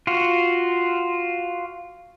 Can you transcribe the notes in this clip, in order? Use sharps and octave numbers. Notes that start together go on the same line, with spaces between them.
F4 F#4